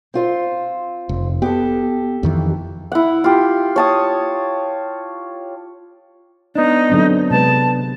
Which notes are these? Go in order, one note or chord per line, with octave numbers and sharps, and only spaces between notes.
C4 F4 C5
F1
B3 G4 A4
F2 D#3 E3
E4 F#5
F4 G4
C#5 A5 D#6
B3 D4 D#4
D3 F#3 C4
C3 G#3 B4 A5